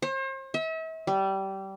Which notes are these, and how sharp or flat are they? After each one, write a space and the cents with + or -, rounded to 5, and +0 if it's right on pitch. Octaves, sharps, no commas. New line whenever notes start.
C5 +40
E5 -40
G3 -20